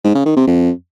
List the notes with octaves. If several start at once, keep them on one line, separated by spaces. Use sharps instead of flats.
G#2
C#3
D#3
C3
F2